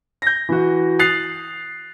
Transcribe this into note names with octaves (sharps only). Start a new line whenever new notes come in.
G6 A#6
E3 F#4
D#6 F#6 A6 C7 F7